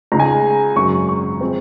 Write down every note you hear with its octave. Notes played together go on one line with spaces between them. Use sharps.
C#2 C#3 G#3 D#4 A#5
G#5
A#5
G#1 F#2 C#3 F#3 C#6
C#6
F3 G#3 C4